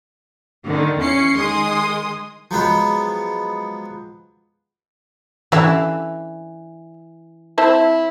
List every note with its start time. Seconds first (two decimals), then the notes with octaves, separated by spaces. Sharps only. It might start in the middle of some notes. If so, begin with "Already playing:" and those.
0.66 D3 D#3
0.98 E2 C#4 C7 C#7
1.37 D#3 G#3 G#4 C6 D#6
2.51 F3 F#3 G#3 B3
5.52 D3 E3 G4 E5
7.58 C4 E4 C5 A5